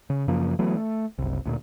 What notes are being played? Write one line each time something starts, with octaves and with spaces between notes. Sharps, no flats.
C#3
F#2 C#3 F3 A#3
E3 F#3 A3 B3
A3
F#1 C2
D2 G2 A#2